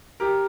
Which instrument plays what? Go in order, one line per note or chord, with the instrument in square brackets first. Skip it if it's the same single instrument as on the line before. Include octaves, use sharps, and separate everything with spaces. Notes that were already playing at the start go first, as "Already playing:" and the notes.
[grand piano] G4 A#4